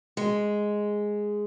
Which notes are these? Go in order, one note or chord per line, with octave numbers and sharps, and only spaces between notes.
G#3